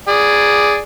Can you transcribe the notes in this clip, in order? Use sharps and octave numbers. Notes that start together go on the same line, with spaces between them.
G#4 D5